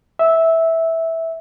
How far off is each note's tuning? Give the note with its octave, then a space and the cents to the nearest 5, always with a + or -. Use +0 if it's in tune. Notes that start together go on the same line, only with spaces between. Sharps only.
E5 -10